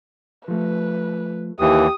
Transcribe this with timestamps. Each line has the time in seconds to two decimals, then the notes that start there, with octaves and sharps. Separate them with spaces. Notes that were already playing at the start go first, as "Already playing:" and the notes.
0.48 F3 A3 B4
1.60 D#2 E3 G4 D#6